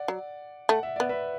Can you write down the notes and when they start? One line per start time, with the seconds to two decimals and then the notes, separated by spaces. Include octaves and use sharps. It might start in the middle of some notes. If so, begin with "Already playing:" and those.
Already playing: D5 F#5
0.08 F#3
0.69 A3 F#5
0.83 E5
0.96 B3 D5
1.09 B4 E5